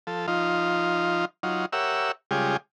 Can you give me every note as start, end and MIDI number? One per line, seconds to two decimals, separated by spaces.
0.07 0.26 53
0.07 0.26 69
0.28 1.25 53
0.28 1.25 63
0.28 1.25 65
1.43 1.66 54
1.43 1.66 63
1.43 1.66 65
1.73 2.12 67
1.73 2.12 70
1.73 2.12 73
1.73 2.12 76
1.73 2.12 78
1.73 2.12 88
2.31 2.57 49
2.31 2.57 55
2.31 2.57 56
2.31 2.57 65
2.31 2.57 67
2.31 2.57 68